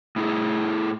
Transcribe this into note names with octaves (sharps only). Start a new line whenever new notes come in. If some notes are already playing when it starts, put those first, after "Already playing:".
A2 E4 G#4